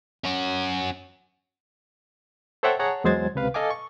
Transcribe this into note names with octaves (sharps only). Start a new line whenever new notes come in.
C#4 F#4
A4 C5 C#5 E5 F#5 G5
G#4 C#5 F#5 A5 A#5
E2 F#3 G#3 C5 G#6 A6
C#2 C3 B4 F5
A4 D#5 F5 G#5 D6
C#6